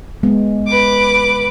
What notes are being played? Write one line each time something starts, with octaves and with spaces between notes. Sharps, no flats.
G#3 B3
B4 D6